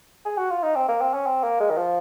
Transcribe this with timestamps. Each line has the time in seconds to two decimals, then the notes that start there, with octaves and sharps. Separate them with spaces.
0.25 G#4
0.38 F#4
0.50 F4
0.63 D#4
0.76 C4
0.89 A#3
1.01 C4
1.14 C#4
1.26 C4
1.44 A#3
1.60 G#3
1.70 D#3
1.77 F3